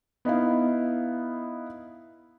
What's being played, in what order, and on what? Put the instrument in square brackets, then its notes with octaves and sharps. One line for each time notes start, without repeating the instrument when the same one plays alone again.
[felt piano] B3 D#4 E4 F5